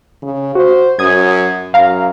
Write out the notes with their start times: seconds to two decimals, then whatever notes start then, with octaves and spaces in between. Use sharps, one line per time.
0.22 C#3
0.55 F#4 C5
0.99 F#2 D#6 G#6
1.74 F#2 F5 A#5